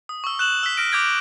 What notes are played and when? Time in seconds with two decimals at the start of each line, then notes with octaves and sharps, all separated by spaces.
0.09 D#6
0.24 C#6 E6
0.39 F#6 E7 F#7
0.63 E6 B6
0.77 F6 A#6 D7
0.92 D6 G6 G#6 D7